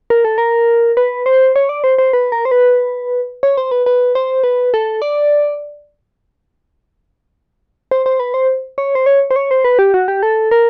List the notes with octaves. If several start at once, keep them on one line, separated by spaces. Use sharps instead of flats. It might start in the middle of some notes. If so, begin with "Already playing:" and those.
A#4
A4
A#4
B4
C5
C#5
D5
C5
C5
B4
A#4
C5
B4
C#5
C5
B4
B4
C5
B4
A4
D5
C5
C5
B4
C5
C#5
C5
C#5
C5
C#5
C5
B4
G4
F#4
G4
A4
A#4